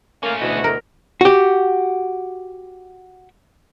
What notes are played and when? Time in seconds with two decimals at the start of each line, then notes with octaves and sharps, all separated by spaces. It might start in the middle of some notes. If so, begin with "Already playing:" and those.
0.23 A3 A#3 C#4 F5
0.41 D2 B2 E4 F#4
0.64 A#4
1.21 F#4 G4